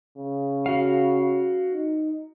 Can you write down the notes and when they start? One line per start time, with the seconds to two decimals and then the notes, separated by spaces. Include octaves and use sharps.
0.18 C#3
0.66 F#4 F5
1.73 D#4